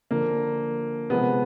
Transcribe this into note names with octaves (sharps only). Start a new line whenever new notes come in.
D3 F3 A#3
C3 F3 G#3 B3